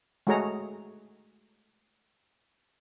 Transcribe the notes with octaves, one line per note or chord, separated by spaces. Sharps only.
G#3 A3 F#4 G#4 C#5 A#5